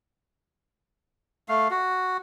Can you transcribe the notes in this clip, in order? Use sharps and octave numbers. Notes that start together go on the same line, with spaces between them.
A3 F5
F#4